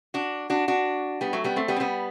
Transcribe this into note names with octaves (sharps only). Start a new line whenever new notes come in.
D4 F#4
D4 F#4
D4 F#4
G3 B3
F#3 A3
G3 B3
A3 C4
G3 B3
C4
G3 B3